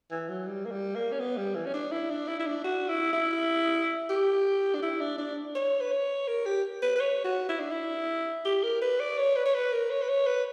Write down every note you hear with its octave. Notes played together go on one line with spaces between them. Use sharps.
E3
F#3
G3
A#3
G3
A#3
C#4
B3
G3
E3
C#4
D4
E4
D4
E4
E4
D4
F#4
E4
E4
G4
D4
E4
D4
D4
C#5
B4
C#5
A#4
G4
B4
B4
C#5
F#4
E4
D4
E4
G4
A#4
B4
D5
C#5
B4
C#5
B4
A#4
C#5
B4
C#5
B4